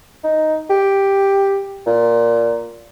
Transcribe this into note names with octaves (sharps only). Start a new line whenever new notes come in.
D#4
G4
A#2